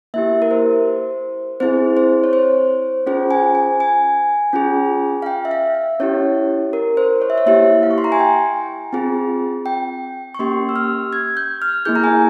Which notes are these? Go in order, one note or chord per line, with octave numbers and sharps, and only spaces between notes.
A#3 E4 G4 E5
A#4
C5
C4 E4 G#4 C5
C5
C#5
C5
C#4 F4 G#4 C5
G#5
G#5
G#5
C#4 F4 G#4
F5
G5
E5
F5
E5
C#4 E4 G4 C#5
A#4
C5
C#5
E5
C#5
A#3 E4 G4 E5
F5
C#6
C6
A#5
G#5
G5
C4 F4 G#4
G5
C#6
A#3 C#4 G4 C6
E6
F6
G#6
G6
F6
A#3 E4 G#4 G6
A#5
G#5